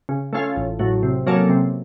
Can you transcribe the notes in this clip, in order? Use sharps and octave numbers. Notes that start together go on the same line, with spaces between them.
C#3
A3 C#4 F4
A1
A2 F#3
C3
F#3 A#3 C#4 A4
C3